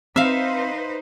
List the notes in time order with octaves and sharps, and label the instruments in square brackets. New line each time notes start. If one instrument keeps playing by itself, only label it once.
[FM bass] C4 [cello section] D#4 B4 C5 [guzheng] E5 F5